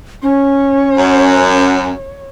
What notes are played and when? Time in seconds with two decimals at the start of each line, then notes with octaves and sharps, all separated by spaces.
0.23 C#4 C#5
0.98 F#2